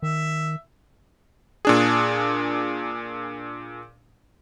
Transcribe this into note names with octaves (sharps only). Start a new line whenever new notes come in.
D#3 E5
A#2 D4 G#4